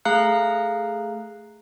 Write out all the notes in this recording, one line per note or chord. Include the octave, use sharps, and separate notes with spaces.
A3 G#4 F5 A#5 F#6